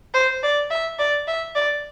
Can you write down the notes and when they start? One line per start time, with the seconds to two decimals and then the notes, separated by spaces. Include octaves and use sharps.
0.14 C5
0.43 D5
0.70 E5
0.99 D5
1.28 E5
1.55 D5